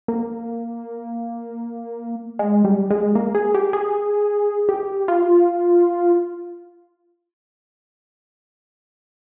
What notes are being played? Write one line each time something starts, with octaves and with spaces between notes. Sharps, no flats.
A#3
G#3
G3
G#3
A#3
G#4
G4
G#4
G4
F4